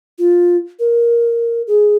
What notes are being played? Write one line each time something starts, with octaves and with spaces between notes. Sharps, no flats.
F4
A#4
G#4